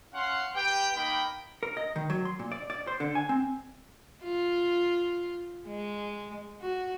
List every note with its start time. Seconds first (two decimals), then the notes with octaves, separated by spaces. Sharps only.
0.14 C#4 F5 F#5 C6
0.55 G4 B4 G5
0.96 A#3 D#4 G5 B5
1.63 A#4
1.77 D#5
1.96 D#3
2.10 F#3
2.25 C6
2.39 A#2
2.52 D5
2.70 D5
2.87 C5
3.00 D3
3.15 G#5
3.29 C4
4.23 F4
5.67 G#3
6.61 F#4